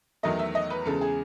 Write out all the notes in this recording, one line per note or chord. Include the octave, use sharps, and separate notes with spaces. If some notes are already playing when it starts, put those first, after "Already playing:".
E2 D#3 F#3 A3 D#5
E5
D#5
B4
E2 C#3 G#3 A4
G#4